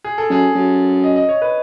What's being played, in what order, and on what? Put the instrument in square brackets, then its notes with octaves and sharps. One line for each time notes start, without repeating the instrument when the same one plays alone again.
[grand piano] G#4
A4
[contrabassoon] F#2 [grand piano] G#4
[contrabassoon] F#2
[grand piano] D#5
D#5
C#5
B4